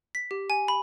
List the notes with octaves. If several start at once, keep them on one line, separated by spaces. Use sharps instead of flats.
B6
G4
G#5
B5